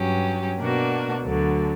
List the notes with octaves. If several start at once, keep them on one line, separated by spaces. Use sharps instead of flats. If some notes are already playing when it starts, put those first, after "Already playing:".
Already playing: G2 F#3 C#4 G4
B2 A#3 D4 F#4
D2 D3 F#3